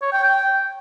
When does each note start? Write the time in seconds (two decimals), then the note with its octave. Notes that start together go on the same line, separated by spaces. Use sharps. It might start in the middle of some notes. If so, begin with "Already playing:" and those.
0.02 C#5
0.13 G5
0.23 G5